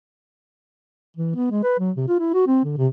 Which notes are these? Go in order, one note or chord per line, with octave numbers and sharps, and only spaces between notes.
E3
B3
G#3
B4
F#3
C3
F4
E4
F#4
C4
D3
C3